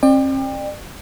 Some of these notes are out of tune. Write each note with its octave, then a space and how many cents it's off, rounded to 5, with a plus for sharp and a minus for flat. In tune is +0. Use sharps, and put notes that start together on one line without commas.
C4 +45 D5 +35 G5 +25